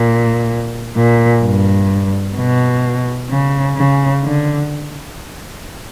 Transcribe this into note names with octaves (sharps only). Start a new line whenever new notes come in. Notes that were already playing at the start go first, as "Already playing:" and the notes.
Already playing: A#2
A#2
G2
B2
C#3
C#3
D3